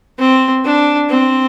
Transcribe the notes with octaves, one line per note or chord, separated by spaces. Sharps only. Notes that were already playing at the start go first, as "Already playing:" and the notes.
C4
D4
C4